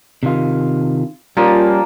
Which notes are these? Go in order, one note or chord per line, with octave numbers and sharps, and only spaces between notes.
C3 D#3 F4
F3 G3 A#3 C#4